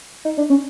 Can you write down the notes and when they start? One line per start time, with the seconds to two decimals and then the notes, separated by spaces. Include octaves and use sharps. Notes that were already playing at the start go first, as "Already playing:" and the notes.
0.25 D#4
0.38 D4
0.50 C#4